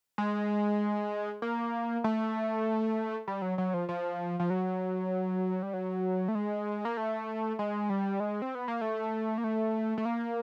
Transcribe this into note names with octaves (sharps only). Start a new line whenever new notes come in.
G#3
A#3
A3
G3
F#3
F#3
F3
F3
F3
F#3
G3
F#3
A3
G#3
A#3
A3
G#3
G3
G#3
C4
B3
A#3
A3
A#3
A3
A3
A#3